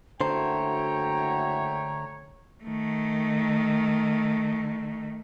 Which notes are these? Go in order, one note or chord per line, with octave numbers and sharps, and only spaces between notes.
F#1 D3 A3 F#4 C5 C#5 G5 A#5
D#3 A3